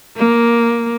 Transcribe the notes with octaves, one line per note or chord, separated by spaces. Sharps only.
A#3